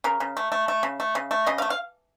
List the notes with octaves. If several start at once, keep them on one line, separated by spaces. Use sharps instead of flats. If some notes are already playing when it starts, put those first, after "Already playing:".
C#3 A#4
C#3
A3
A3
A3
C#3
A3
C#3
A3
C#3 D#5
F5
A3
F5